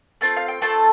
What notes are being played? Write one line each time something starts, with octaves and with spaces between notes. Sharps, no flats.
A3 C4 F4 A5
F5
G5
A3 C4 F4 A4 A5